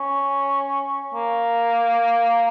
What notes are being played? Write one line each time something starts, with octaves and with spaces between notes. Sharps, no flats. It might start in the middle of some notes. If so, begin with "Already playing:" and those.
Already playing: C#4
A#3